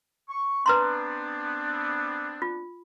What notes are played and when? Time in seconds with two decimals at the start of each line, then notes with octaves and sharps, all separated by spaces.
0.29 C#6
0.66 B3 C4 D4 B4 A#5 C6
2.42 F4